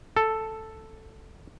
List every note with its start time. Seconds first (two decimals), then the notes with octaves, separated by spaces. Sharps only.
0.17 A4